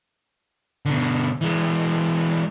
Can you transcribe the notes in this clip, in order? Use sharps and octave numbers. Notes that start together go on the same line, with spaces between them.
B2 D3
E3 G#3